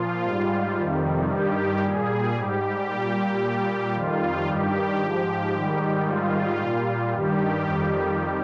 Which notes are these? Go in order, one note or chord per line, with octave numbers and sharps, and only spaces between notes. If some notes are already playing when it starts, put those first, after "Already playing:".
Already playing: A#2 F3 F4
G#2 G3
F2 C3 D#3 G3
G2 D#3 G3 G4
A#2 G3 G#4
G#2 G3 G4
A#2 G3 G4
A#2 G3 G4
F2 D#3 G3 F4
G2 D#3 G3 G4
G#2 F3 G4
G#2 D#3 G3
G#2 D#3 G3 F4
A#2 G3
G2 D#3 G3 G4
F2 D#3 G3